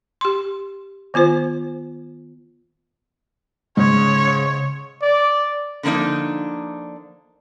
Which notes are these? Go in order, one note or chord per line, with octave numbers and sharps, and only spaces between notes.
G4 C6
D#3 B3 F4 C5
G#2 C#3 C#5
D5
D3 F3 A#3 D4 D#4